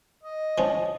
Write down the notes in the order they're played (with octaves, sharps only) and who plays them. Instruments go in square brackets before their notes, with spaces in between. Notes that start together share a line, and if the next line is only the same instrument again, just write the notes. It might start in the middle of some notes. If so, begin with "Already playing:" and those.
[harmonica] D#5
[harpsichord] F3 C#4